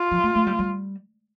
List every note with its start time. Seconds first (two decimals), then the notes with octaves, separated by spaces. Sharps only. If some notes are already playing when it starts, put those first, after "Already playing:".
Already playing: F4
0.11 F3
0.23 A3
0.35 A3
0.47 G3
0.59 G3